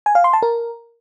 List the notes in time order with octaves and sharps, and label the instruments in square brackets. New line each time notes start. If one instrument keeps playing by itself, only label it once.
[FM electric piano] G#5
F5
C6
A5
A#4